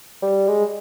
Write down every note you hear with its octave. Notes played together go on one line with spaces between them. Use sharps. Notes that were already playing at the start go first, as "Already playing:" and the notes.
G3
G#3